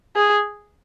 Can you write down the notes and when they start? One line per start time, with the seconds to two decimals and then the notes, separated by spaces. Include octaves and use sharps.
0.16 G#4